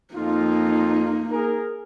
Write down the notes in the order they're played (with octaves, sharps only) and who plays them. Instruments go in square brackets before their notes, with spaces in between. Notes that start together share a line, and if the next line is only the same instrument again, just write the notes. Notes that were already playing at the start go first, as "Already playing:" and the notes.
[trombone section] F2 F4 [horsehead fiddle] A#3 D#4
[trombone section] G#4 A#4